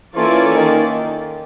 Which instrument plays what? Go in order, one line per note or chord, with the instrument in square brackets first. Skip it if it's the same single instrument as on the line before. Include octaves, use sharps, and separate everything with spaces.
[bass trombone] E3 [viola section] A#3 C#4 F4 A4 D5
[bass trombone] D#3